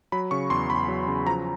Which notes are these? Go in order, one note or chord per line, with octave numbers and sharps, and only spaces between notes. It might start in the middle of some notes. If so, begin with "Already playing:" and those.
F#3 B5
C#3 C#6
E2 C6
E2 B5
F#3
C#3
F3 A#5